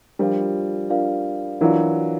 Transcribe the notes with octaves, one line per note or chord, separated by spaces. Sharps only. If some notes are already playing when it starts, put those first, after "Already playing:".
F3 G3 D4 F4 A#4 D5 F5
D4 F4 A#4 D5 F5
E3 F#3 D4 F4 A#4 D5 F5